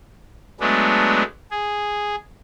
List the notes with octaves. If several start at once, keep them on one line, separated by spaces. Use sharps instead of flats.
F#3 G#3 A3 B3 D4
G#4